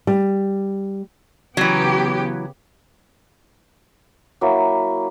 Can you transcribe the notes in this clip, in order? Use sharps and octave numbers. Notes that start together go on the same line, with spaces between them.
G3
C#3 E3 F#3 B3 G4
F#3 A#3 E4